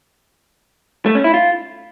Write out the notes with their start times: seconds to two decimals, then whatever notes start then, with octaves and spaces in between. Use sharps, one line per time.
1.06 A3
1.15 C#4
1.24 E4
1.34 F4